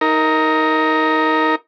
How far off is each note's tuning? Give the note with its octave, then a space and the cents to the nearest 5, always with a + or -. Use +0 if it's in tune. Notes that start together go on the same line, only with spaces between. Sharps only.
D#4 +20 A#4 +0